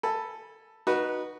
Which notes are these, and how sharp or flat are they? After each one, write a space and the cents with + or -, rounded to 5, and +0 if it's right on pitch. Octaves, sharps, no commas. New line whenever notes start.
A4 +5 G#5 +0 B5 -15
D#4 -15 F#4 +0 B4 -20